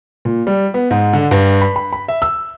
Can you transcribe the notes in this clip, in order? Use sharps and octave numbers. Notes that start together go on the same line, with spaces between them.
A#2
G3
B3
G#2
D3
G2
B5
B5
B5
E5
E6